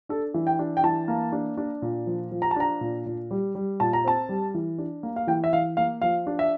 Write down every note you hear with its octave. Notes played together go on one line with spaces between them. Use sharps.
D4 A4
E3
G5
D4
G5
E3 A5
A#3
D4
D4
A#2
F3
F3
A#5
A5
D4 A#5
A#2
A#2
G3
G3
A#2 A5
A#5
C4 A5
G3
E3
D4
A#3
F5
E3 G5
E5
E3 F5
A#3 F5
F3 F5
D4
E5